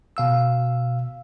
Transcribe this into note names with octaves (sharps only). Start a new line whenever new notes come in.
B2 F5 E6